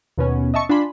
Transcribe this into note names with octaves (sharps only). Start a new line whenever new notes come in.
D#2 B2 B3 C#4
D#5 E5 A5 C#6
D4 F4 G#5 B5 C6